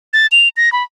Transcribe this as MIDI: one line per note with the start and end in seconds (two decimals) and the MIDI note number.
0.13 0.27 93
0.32 0.48 101
0.57 0.72 94
0.73 0.83 83